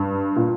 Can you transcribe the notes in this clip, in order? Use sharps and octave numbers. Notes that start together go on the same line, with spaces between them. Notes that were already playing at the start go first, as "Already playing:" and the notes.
Already playing: G2
A#2